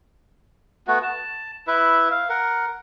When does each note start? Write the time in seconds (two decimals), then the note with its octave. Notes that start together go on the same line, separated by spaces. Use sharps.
0.87 A3 B3 F#4
1.03 A5
1.67 E4 B4 E5
2.11 F5
2.29 A#4 F#5